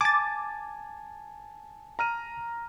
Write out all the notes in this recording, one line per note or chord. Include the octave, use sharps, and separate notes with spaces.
G#5 A5 D6 A6
A#5 F6 D#7